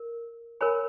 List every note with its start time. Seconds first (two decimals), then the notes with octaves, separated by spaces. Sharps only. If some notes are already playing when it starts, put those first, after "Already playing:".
Already playing: A#4
0.61 A#4 C#5 G#5 B5